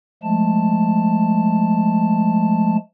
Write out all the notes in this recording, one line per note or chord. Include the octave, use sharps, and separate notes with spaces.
F3 G#3 A3 A5